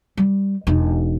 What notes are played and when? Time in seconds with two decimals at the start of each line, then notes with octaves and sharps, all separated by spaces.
0.17 G3
0.67 E1 D#4